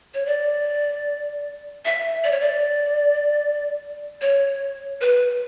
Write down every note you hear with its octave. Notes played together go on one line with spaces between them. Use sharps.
C#5
D5
E5
D5
C#5
D5
C#5
B4